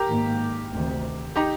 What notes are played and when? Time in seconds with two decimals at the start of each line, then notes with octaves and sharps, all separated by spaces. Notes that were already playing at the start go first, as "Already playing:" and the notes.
Already playing: G4 A#4
0.08 G#2 D#3 A#3
0.73 D2 C3 D#3
1.36 D#4 G4